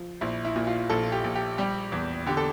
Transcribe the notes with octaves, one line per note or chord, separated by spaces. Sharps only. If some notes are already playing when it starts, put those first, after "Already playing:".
Already playing: F3
A#1 E4
E4
A#2
F4
A#1 A4
F4
G4
A#1
G4
G3 G4
E2
D3 G4
A4